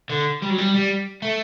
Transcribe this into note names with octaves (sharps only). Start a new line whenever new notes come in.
D3
G3
F#3
G3
G3
A3